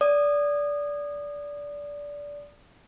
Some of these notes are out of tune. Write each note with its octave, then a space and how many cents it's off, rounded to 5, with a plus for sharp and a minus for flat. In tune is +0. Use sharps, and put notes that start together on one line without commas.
D5 -15 D#6 -25